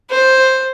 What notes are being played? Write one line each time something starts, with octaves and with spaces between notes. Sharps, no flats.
C5